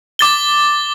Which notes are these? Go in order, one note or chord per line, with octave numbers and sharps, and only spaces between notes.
D6 A6 G7